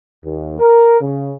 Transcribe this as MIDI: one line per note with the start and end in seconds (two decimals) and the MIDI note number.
0.24 0.59 39
0.59 1.00 70
1.01 1.34 49